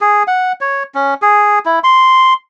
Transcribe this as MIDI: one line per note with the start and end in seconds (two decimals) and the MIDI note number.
0.01 0.23 68
0.28 0.52 78
0.61 0.83 73
0.95 1.14 61
1.22 1.59 68
1.66 1.79 64
1.84 2.33 84